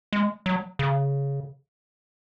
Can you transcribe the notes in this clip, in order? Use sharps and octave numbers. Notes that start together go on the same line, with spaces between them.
G#3
F#3
C#3